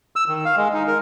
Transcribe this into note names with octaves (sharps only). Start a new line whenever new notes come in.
E6
D#3
F5
G#3
D#4
A#4